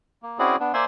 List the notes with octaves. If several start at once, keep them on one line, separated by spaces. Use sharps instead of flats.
A#3
C4 C#4 E4 F#4 G#4 D5
B3 D4
A#3 C5 D5 E5 G#5 C6